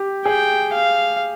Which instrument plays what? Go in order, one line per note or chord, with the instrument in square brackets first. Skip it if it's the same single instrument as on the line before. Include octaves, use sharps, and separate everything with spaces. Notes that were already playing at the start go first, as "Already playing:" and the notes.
Already playing: [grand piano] G4
[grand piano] G#4 [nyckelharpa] G5
[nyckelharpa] F5